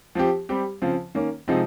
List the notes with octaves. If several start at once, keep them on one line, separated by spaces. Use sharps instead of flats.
F3 C4 G4
G3 C4 G4
C#3 F3 C4
D#3 A#3 C#4
C3 F3 G#3 C4 D#4